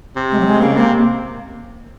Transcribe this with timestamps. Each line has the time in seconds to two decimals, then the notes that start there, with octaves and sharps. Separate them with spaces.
0.16 C3
0.32 G#3
0.40 F#3
0.46 G#3
0.61 C#3 A#3
0.76 C3 A#3